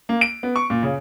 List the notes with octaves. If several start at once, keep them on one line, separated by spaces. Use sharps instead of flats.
A#3
D7
B3
C#6
A#2
C#3